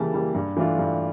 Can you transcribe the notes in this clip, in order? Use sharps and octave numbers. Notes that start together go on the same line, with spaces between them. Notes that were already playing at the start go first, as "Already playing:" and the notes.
Already playing: C#3 E3 G3 A#3 A5
E3 G3 A#3
G2
E3 A3 D4 F4
G2